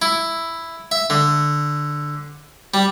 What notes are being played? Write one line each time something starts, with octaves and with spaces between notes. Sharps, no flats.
E4
E5
D3
G3